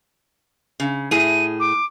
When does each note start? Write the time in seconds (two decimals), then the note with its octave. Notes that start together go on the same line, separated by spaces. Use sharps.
0.80 C#3
1.11 A2 G#4 D#7
1.60 D6